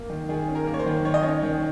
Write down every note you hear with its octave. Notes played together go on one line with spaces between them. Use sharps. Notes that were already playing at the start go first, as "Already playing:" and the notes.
Already playing: A#3
D#3
D#3 G#4
C#4
A#4
A#3
C#5
C5
D#3
D#3 C#5
D#5
C#4 C#5
D#3